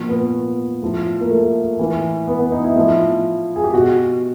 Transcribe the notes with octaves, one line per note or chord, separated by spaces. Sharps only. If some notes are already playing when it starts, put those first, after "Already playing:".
Already playing: A#2 F3
B3
A2 F3
A#3
A3
A2 E3
B3
B3
D#4
E4
A2 F3
G#4
G4
B2 F#4